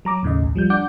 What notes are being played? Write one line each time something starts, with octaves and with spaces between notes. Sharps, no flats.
F#3 A#5 D6
D#2 A2 C#3 D#5
B1
F3 G3 G6
D4 F#5 D6 G6